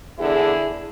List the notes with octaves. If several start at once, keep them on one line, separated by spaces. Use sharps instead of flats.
E2 D3 E4 G#4